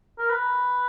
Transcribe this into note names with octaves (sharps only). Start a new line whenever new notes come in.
A#4
B4